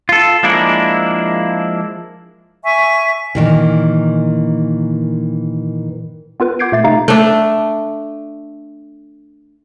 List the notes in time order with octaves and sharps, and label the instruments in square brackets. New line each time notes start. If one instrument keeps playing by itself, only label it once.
[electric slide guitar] F4 A4
F3 G#3 A#3 D4 E4
[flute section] E5 G#5 C#6
[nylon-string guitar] A#2 D#3 E3
[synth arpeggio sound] B3 F4 A#4 B4
F#5 D6 G6 G#6 C7 D7
A#2 A3 A6 C7
C3 G#3 A3 D#4 F5 A#5
[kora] A3 D4